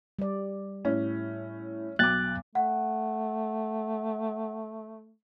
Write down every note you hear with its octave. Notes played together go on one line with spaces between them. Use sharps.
G3 D5
A2 C#4
B1 G5 D6 F#6 A6
A3 F#5